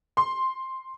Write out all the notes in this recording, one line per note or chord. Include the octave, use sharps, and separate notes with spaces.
C6